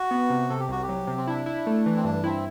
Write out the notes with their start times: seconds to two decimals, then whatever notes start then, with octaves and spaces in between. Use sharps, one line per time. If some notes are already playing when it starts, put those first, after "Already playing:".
Already playing: F#4
0.11 B3
0.30 C3
0.50 C3 A4
0.60 G4
0.69 C2 F#4
0.82 G4
0.89 F#3
1.07 C3
1.17 C4
1.27 D4 E4
1.46 E4
1.67 A3
1.86 E3
1.97 C4
2.04 G2 D4
2.24 C4 E4